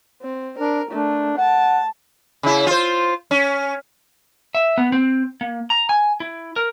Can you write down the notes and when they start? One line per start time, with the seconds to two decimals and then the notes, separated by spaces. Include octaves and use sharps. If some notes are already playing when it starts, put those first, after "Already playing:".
0.23 C4
0.59 D4 A#4
0.91 A3 D4
1.37 F#5 A5
2.43 C#3 E4
2.67 F4 C5
3.31 C#4
4.55 E5
4.78 B3
4.92 C4
5.41 A#3
5.70 A#5
5.89 G#5
6.20 E4
6.56 A#4